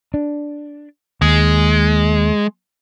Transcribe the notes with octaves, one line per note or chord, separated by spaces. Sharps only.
D4
D#2 G#3